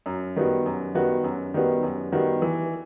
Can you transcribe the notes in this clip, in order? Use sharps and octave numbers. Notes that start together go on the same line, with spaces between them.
F#2
D#3 G3 B3 F#4
F#2
D#3 G3 B3 F#4
F#2
D#3 G3 B3 F#4
F#2
D#3 G3 B3 F#4
E3